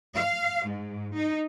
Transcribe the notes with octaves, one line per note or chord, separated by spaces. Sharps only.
F5
G#2
D#4